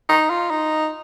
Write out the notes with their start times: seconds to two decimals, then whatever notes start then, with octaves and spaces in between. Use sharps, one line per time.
0.09 D#4
0.30 F4
0.50 D#4